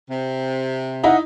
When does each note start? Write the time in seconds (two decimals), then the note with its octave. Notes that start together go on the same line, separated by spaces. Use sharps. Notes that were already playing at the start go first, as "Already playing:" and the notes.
0.08 C3
1.04 D#4 E4 D#5 F#5